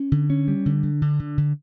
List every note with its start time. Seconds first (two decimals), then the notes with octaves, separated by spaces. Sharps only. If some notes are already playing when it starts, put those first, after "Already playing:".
Already playing: C#4
0.12 D3
0.30 C#4
0.48 G3
0.66 D3
0.83 D3
1.02 D3
1.20 D3
1.38 D3